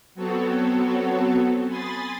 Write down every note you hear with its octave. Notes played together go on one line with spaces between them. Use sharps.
F#3 B3 C4 F#4 A4 C#5
G#5 B5 C6 D#6 A6